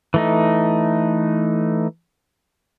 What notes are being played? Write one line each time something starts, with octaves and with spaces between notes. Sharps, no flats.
E3 A3 D#4